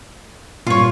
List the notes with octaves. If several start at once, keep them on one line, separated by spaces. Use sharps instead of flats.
G2 A#2 F4 C#5